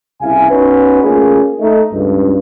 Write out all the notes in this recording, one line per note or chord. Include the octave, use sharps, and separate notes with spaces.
C2 C#3 E4 F5 G#5
B3 C#4 D#4 F#4 B4
A3 A#3 C#4 F4 G#4
A3 D#4
C#2 G2